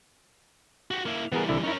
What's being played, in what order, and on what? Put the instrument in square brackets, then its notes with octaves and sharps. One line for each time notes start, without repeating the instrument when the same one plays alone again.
[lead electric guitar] F#4 G4
A#3 E4
[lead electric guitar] E3 G3 [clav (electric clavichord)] B3 G#4 A#4
[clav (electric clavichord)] C2 D3 E4
[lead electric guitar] C#4 A#4 [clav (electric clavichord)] D#4 E4